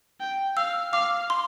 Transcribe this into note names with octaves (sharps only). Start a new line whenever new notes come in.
G5
F5 E6
F5 D6
C6